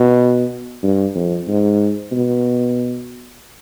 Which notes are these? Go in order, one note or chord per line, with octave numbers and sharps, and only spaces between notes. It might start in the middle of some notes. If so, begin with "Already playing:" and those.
Already playing: B2
G2
F2
G#2
B2